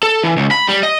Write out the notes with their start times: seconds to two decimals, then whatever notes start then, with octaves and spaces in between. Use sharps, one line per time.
0.03 A4
0.23 E3
0.37 C#2
0.51 B5
0.69 G3
0.83 D#5